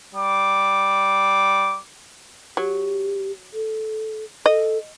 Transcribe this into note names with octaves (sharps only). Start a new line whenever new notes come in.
G3 D6
F#3 G4
A4
A4 D#5